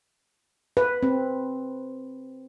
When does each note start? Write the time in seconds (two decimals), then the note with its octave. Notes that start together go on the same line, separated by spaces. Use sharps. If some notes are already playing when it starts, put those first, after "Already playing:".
0.77 B4
1.03 C4